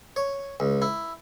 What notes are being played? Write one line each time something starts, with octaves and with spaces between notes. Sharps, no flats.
C#5
C#2
E4